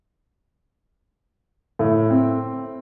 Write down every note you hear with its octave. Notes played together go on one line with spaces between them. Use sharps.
A2
C4